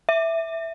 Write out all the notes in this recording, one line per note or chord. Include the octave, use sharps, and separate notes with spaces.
E5